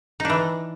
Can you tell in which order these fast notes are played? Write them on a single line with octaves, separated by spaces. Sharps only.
D#4 D4 E3